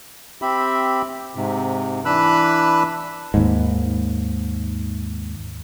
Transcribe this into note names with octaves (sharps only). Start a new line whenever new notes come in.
C4 G4 E5 B5
G#2 C3
E3 D4 B4 B5 E6 F#6
D#2 G#2